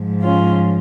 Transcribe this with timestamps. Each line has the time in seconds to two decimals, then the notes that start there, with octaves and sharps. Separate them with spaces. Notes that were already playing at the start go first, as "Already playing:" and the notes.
Already playing: G#2 F3
0.22 C#4 F4